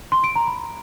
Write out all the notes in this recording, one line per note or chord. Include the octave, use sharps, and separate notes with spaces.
C6
D7
A#5
B5